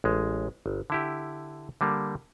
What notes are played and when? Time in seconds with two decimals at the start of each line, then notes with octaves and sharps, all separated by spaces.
0.04 A1 G#3
0.66 G1
0.90 D3 E4 G4
1.81 D3 G3 A#3